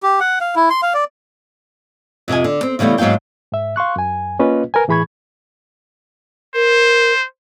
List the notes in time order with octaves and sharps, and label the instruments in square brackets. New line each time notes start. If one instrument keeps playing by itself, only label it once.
[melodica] G4
F#5
F5
E4
C6
F5
D5
[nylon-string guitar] F2 C3 D#5 G#5
D3
C4
C#3 E3 G3 A3 B3
G#2 F#3 A#3 F5 G5
[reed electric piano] G#2 E5
F5 C6 C#6 F#6
F#2 G#5
A#3 C#4 F4 B4 D#5
A#4 B4 G#5
A2 E3 G#4 B5 C#6 G#6
[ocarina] A#4 [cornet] C5